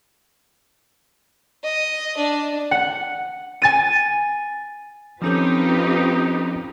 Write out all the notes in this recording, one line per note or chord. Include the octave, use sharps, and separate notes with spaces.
D#5
D4
F#5
G#5 A6 D#7
F3 C4 C#4 D#4 F4 G4 A4 B4